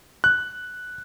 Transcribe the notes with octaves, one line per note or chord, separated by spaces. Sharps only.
F#6